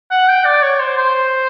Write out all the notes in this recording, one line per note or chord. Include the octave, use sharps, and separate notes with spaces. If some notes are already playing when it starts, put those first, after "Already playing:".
F#5
G5
D5
C#5
C5
C5